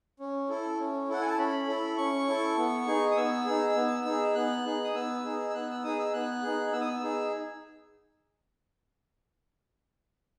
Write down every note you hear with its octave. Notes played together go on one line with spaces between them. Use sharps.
C#4
E4 A4
C#4
E4 A4 F#5
G#5
A5
C#4 B5
E4 A4
C#4 C#6
E4 A4
B3
D#4 G#4
D#6
B3 E6
D#4 G#4
B3
D#4 G#4
B3 F#6
D#4 G#4
D#6
B3 E6
D#4 G#4
E6
B3 F#6
E6
D#4 G#4 D#6
E6
B3 F#6
D#4 G#4
B3 E6
D#6
E6
D#4 G#4